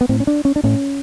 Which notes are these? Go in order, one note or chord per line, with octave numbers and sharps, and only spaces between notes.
B3
A2 C4
C#4
D4
C#4
D4
A2 C#4